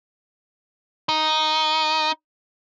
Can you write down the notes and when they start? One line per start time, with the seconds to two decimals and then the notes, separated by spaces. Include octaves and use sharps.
1.09 D#4